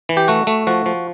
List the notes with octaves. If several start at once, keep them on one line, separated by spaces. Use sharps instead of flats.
E3
G4
A3 F#4
A3
F3 F#4
F3